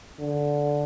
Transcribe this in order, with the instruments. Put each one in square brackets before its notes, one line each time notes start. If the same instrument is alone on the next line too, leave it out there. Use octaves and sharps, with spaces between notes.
[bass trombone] D3